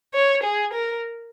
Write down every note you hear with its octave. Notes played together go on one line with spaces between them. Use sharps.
C#5
G#4
A#4